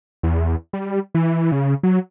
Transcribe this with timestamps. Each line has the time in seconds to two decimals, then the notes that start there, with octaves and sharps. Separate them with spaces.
0.23 E2
0.73 G3
1.15 E3
1.52 C#3
1.83 F#3